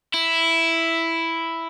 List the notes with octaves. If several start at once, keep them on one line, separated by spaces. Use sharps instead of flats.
E4